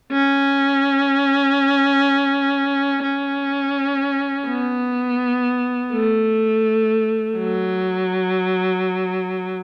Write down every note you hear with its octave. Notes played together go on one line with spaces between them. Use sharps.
C#4
C#4
B3
A3
F#3